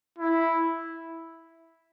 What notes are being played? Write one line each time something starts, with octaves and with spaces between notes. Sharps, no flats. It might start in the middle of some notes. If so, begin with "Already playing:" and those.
E4